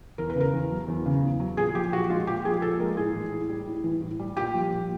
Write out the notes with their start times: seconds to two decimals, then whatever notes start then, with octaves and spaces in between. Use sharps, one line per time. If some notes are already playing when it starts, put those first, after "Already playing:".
0.18 E2 A#4
0.30 B4
0.35 C#3
0.40 A#4
0.53 E2
0.70 F#3
0.88 E2
1.06 C#3
1.23 E2
1.40 F#3
1.57 A#2 G#4
1.75 F3 G4
1.92 A#2 F#4
2.10 G#3 F4
2.27 A#2 G4
2.45 F3 G#4
2.62 A#2 A4
2.79 G#3 A#4
2.97 A2 G#4
3.15 E3
3.32 A2
3.49 G3
3.67 A2
3.84 E3
4.02 A2
4.19 G3
4.37 A#2 G4
4.54 F3
4.72 A#2